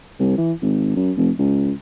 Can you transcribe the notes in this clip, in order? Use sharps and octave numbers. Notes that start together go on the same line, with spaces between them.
C2
E3
G#1
F#2
F1
C#2